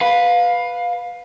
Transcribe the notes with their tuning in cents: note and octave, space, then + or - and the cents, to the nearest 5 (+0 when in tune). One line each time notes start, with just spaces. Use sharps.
B4 +0 F5 +20